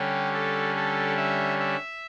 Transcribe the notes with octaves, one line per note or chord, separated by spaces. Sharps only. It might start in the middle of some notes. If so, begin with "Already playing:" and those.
Already playing: D3 G3 C#4 G4
A4
A4
E5
E5